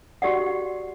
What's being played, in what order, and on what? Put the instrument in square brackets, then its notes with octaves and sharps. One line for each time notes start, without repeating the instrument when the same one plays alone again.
[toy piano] F#4 G4 D5 F#5